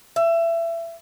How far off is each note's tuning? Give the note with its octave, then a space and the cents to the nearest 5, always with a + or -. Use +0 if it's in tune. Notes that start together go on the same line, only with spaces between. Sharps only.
E5 +25